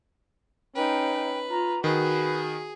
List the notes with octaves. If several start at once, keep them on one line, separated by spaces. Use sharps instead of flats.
C#4 D#4 B4 G5
F4 A#5
D#3 F#4 G#4 B4